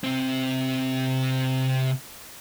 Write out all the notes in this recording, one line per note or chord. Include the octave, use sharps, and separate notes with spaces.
C3 C4